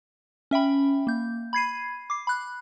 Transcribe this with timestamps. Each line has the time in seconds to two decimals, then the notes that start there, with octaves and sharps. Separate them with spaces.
0.51 C#4 E5 G5 B5
1.07 A#3 G6
1.53 B5 G#6 C7 D#7
2.10 D6 C7
2.27 B5 F#6